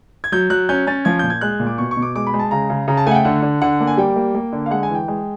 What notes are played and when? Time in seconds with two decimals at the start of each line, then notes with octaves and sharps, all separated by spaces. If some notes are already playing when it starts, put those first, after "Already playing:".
0.24 G#6
0.32 F#3 G6
0.50 F#3 F#6
0.69 C#4 G6
0.87 C#4 A6
1.05 F3 G#6
1.19 A#2 G6
1.30 G#6
1.41 G#3 F#6
1.60 A#2
1.67 D6
1.78 B2 C#6
1.91 C#6
1.97 B2
2.02 D6
2.15 G#3 D6
2.27 B5
2.34 G#3
2.39 A5
2.51 C#3 A#5
2.70 C#3
2.88 C#3 A#5
2.97 A5
3.06 A3 G#5
3.11 F#5
3.15 G5
3.25 D3 F#5
3.42 D3
3.62 D3 F#5
3.80 A#3
3.87 G#5
3.97 G3 G5
4.16 A#3
4.35 A#3
4.53 D3
4.66 F5
4.71 G#3 F#5
4.83 G#5
4.89 E3
4.95 G5
5.08 G#3